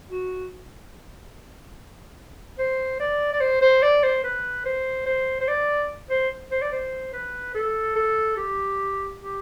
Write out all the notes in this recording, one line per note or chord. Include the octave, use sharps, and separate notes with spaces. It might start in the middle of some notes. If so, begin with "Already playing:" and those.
F#4
C5
D5
D5
C5
C5
D5
C5
B4
C5
C5
C5
D5
C5
C5
D5
C5
B4
A4
A4
G4
G4